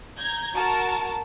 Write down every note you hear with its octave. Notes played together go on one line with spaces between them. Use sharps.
A#5 G6 G#6
F#4 A#4 A5